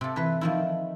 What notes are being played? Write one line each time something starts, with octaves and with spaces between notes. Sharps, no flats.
C3 A4
E3 B4
D#3 F3 E4